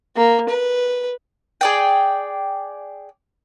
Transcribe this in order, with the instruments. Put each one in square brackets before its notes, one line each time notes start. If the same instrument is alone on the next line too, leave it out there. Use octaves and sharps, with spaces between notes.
[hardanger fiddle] A#3
B4
[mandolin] G#4 D5 G5